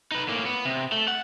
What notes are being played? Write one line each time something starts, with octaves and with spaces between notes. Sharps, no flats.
D#4 B4
A2 A#3
B3
C3
A3
F#5